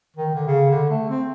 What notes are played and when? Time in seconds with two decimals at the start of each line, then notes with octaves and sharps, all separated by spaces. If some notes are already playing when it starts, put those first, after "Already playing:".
0.17 D#3
0.35 D3
0.47 C#3
0.70 D3
0.90 A3
1.09 C4